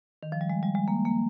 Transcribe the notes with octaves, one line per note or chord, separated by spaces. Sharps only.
D#3
F3
G3
G#3
G3
G#3
A#3
A#3